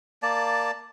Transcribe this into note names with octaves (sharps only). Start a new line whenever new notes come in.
A#3 D5 A5